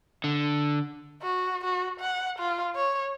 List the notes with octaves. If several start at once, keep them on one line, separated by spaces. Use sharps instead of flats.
D3
F#4
F#4
F#5
F4
C#5